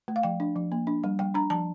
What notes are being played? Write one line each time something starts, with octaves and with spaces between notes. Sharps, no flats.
A3
F5
F3 G5
D4
F3
A#3
D4
G3
G3 G5
D4 A#5
F3 A5